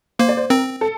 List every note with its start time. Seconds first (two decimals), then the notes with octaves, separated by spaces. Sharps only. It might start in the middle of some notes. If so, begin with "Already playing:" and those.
0.19 A#3 C5
0.29 D5
0.37 C5
0.50 C4 A#4
0.81 A4